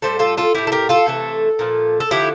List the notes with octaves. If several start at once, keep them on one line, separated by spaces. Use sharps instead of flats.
A2 G3 A4 C5
F4 A4
F4 A4
A2 G3 E4 G4
A4
G4 A#4
F4 A4
C3 E3 A3
A#2 F3 A3
A4
D3 F3 A3 E4 G4